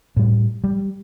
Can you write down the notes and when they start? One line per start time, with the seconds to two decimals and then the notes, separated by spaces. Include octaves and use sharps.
0.17 A2 G3
0.64 G3